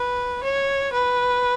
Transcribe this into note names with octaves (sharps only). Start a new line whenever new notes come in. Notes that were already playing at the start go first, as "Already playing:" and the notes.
Already playing: B4
C#5
B4